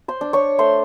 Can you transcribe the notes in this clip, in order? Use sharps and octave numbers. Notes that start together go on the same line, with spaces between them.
C5 C6
D4
C#5 C#6
A3 C5 C6